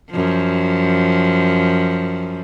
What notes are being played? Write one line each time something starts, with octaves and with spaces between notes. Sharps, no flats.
F#2 F3